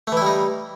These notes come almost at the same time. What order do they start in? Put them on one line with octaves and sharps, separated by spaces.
A3 E3 E4 G3 D#4